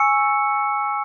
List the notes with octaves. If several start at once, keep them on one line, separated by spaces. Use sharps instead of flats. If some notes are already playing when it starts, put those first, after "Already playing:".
Already playing: G#5 C#6 E6 C#7